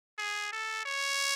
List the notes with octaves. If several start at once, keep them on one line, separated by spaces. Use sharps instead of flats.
G#4
A4
C#5